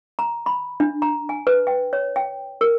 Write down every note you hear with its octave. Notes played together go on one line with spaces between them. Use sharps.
A#5
B5
D4
A#5
G#5
B4
G5
C#5
G5
A#4